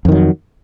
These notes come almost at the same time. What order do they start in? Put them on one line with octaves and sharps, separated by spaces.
F2 D#3 F#3